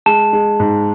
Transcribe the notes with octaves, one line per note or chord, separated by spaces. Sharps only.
G#3 A5
G#3
G#2